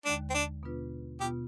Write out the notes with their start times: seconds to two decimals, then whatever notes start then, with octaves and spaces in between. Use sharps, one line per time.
0.05 D#2 D3 G#3 D4
0.30 C4
0.34 D4
0.63 B2 B3 D4 F4 B4
1.21 B2 B3 F4 G4